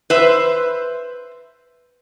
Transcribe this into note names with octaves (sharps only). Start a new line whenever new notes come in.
B4 C5 E5